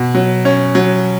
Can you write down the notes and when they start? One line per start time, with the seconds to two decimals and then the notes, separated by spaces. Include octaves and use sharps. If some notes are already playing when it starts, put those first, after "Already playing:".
Already playing: B2
0.15 F#3
0.45 C#4
0.75 F#3